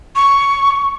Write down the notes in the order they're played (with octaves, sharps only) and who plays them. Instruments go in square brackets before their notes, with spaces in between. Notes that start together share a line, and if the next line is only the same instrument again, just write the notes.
[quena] C#6